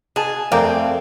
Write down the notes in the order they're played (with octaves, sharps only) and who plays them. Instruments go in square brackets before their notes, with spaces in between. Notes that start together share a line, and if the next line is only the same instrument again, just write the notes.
[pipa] B2 A5 [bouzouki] G#4
[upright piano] F2 G#4 G6 [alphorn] A3 [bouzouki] C4 [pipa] A#4 D5 F5